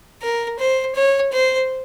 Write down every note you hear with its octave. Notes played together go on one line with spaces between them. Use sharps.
A#4
C5
C#5
C5